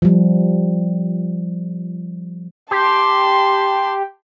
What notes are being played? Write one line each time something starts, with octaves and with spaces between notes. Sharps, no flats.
F3 G3
G4 A5 C6